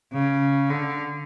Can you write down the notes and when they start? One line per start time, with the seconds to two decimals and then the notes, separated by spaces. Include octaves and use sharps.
0.13 C#3
0.70 D3